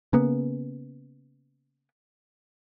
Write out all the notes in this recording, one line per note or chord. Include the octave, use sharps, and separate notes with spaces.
C#3 A#3 B3